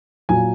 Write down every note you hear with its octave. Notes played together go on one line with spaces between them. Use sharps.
A#2 F#3 G#5